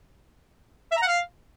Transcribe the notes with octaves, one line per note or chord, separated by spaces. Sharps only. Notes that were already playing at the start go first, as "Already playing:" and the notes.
E5
A#5
F#5
F5